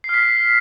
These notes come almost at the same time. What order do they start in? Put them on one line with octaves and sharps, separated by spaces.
C7 F6 B6